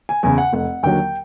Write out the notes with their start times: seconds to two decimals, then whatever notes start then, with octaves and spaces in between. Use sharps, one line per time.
0.09 G#5
0.23 E2 C#3 G#5
0.38 F#5
0.53 F1 F#5
0.83 D#2 D3 F#3 G5